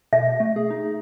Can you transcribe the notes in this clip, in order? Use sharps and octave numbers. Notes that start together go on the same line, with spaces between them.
B2 E5
A3
G#4
D#4